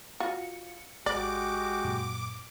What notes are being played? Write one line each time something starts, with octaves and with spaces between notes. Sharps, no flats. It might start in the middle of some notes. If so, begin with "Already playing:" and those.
F4 F#4 C#7
G#1 G#3 F#4 G4 D5 D6
F#2 A#2